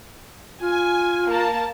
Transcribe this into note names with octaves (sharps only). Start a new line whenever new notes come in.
F4 G#5
A#3 A#4 A5